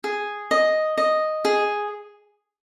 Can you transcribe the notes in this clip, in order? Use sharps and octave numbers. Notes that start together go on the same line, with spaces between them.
G#4
D#5
D#5
G#4